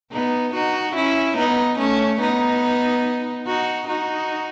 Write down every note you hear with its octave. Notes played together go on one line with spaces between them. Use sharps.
B3 D#4
D#4 F#4
C#4 E4
B3 D#4
A3 C#4
B3 D#4
D#4 F#4
D#4 F#4